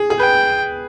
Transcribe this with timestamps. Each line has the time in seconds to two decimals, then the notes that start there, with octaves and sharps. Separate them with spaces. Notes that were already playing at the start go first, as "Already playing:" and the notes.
Already playing: G#4
0.10 G#4
0.20 B4 G5